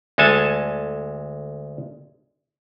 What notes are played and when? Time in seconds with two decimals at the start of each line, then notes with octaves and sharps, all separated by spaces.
0.18 D2 G#3 A4 G#5 A5